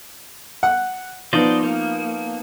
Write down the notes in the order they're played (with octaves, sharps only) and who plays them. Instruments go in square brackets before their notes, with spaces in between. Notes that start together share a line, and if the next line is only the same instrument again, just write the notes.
[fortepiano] F#5
[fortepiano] F3 B3 D#4 [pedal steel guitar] C5 D5 D#5
[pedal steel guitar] A#3